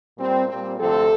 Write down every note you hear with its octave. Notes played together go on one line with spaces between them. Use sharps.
A#2 G3 C4
A#2 G3 C4
D2 C3 F3 C4 A4